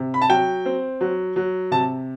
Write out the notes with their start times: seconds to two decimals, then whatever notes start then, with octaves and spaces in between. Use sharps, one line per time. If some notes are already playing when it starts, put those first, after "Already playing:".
Already playing: C3
0.14 B5
0.22 A5
0.29 F#3 G5
0.65 C4
1.01 F#3
1.36 F#3
1.71 C3 A5